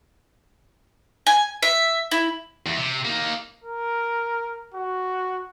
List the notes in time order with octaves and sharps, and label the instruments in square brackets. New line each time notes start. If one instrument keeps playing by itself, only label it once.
[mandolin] G#5
E5
E4
[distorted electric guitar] E2
C3
A#3 D#4
[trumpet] A#4
F#4